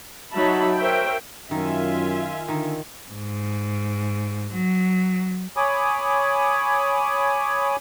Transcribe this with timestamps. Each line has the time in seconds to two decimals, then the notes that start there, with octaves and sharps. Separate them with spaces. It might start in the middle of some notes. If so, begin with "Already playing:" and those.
0.34 F#3 D#4 E5 A5 B5
0.77 A#4 C5 C#5 E5 G5
1.51 F#2 D#3 F4 E5 G#5
2.48 D3 D#3
3.12 G#2
4.54 F#3
5.57 C#5 G#5 B5 D6 D#6